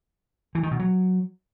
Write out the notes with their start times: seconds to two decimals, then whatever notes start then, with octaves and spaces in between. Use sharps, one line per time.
0.55 E3
0.63 D#3
0.71 B2
0.79 F#3